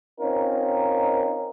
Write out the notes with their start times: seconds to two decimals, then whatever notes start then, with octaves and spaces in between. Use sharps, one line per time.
0.19 C4 C#4 D#4 F4 A#4